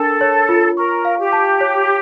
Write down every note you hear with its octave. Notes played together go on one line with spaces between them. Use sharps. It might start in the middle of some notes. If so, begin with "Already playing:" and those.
Already playing: D4 A4 A#4
C#5
F4
A#4 C#6
F5
G4
A5
C#5